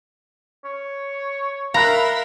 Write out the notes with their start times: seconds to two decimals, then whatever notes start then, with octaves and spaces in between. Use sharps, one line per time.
0.64 C#5
1.74 A#4 E5 F5 A#5 B5 F#6